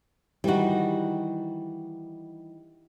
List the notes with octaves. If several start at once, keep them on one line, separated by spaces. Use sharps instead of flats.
D#3 E3 G3 F#4